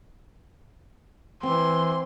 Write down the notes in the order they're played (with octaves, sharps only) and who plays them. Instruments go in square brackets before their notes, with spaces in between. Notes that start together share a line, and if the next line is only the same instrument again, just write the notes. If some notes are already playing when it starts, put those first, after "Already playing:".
[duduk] E3 [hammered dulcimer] C4 [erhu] C6